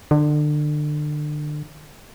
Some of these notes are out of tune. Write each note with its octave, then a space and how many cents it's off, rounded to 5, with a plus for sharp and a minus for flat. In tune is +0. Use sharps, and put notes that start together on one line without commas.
D3 +30